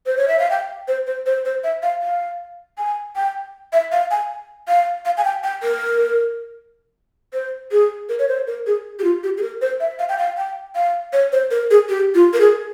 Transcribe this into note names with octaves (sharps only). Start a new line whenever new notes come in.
C5
C#5
E5
F5
G5
C5
C5
C5
C5
E5
F5
F5
G#5
G5
E5
F5
G#5
F5
F5
G#5
G5
G5
A#4
C5
G#4
A#4
C#5
C5
A#4
G#4
G4
F4
G4
G#4
A#4
C5
E5
F5
G5
F5
G5
F5
C#5
C5
A#4
G#4
G4
F4
A#4
G#4